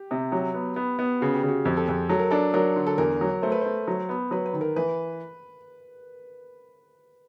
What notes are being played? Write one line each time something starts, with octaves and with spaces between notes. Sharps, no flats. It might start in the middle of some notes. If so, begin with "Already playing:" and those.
Already playing: G4
C3
F#3
B3
B3
B3
C#3 F#4
G4
C#3
F#4
F2 G4
A4
F2 G#4
F#3 A4
A#4
D4 A4
F#3 A#4
D3
A4
E2 A#4
F#3
A3 C5
B4
A3 C5
F#3
B3
F#3 B4
B4
D#3
A#4
E3 B4